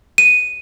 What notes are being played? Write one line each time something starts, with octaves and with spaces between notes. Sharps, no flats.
D#7